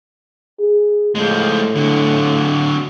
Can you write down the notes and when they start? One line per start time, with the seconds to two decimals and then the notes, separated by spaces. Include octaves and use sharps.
0.59 G#4
1.15 A2 F3 G#3
1.75 D3 F#3